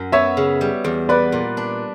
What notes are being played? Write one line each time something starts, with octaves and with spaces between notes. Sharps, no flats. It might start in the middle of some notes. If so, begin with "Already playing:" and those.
Already playing: F#2
B3 C#5 E5
C#3
G3
E2
B3 B4 D5
A#2
D4